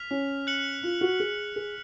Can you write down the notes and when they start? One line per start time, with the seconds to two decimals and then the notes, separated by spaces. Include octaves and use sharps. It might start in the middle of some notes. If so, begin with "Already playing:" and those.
Already playing: F6 B6 F7
0.11 C#4
0.47 F#6 C#7 F#7
0.83 F4
1.01 F#4
1.20 G#4
1.56 G#4